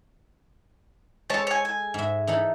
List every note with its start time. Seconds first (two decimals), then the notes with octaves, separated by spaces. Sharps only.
1.30 G#3 A4 C#5 A5
1.47 C#5 G#5
1.65 G#5
1.94 G#2 E5
2.27 E3 D#4 A4